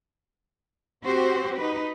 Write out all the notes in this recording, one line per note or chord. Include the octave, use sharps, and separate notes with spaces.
C4 F#4 G4 C5
D#4 B4